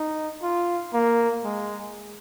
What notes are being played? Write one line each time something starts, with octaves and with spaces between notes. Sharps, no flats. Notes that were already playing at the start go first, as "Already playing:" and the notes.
Already playing: D#4
F4
A#3
G#3